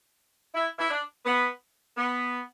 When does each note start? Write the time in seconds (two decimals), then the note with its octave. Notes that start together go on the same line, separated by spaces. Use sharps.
0.55 E4
0.79 E4
0.91 D4
1.26 B3
1.97 B3